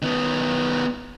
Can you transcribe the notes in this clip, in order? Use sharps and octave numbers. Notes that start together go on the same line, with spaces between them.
D#3 B3